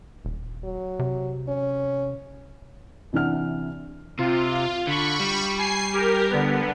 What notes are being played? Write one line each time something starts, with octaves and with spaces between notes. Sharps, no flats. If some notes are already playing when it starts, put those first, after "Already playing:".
D#1
F#3
C3
C#4
C3 E3 D4 F#5 F6
C3 F4
D3 B5 C#6
G3
G#5 C7
G4 A#4
D3 B3